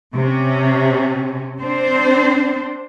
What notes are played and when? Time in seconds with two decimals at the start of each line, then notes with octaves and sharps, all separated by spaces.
0.15 C3 C#4
1.60 C4 D4 C5